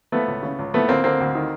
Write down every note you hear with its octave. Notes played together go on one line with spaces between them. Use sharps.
F3 A3 B3
C#2
C#3
C#2
F3 A3 B3
D2 A#3 C4
D3 A#3 C4
D2
D#3